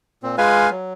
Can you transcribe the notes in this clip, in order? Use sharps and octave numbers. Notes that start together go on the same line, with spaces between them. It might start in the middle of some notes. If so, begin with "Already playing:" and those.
A#2 C4
G#3 F4 B4 F5 G#5
F#3